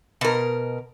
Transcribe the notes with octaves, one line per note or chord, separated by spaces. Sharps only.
B2 A#4